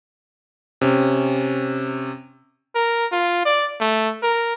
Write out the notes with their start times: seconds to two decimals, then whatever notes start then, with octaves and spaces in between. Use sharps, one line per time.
0.81 C3 C#4
2.75 A#4
3.12 F4
3.45 D5
3.80 A3
4.23 A#4